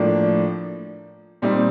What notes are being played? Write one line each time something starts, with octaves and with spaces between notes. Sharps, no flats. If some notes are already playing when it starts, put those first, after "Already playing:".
Already playing: A2 F3 A#3 D4
A#2 G3 C4 D#4